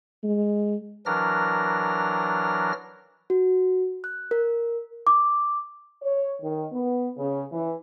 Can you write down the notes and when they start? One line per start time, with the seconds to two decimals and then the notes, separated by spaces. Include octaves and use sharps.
0.23 G#3
1.06 E3 F#3 D4 A#4 F6 A#6
3.30 F#4
4.04 F#6
4.31 A#4
5.07 D6
6.02 C#5
6.42 D#3
6.71 B3
7.18 C#3
7.52 E3